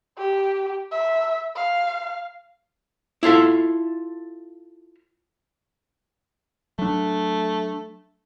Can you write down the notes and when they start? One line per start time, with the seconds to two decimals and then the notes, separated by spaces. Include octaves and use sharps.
0.18 G4
0.92 E5
1.56 F5
3.23 E4 F4 A4 E5
6.79 F#3 A3 D4